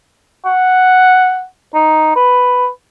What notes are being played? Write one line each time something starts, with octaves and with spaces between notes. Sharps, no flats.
F#5
D#4
B4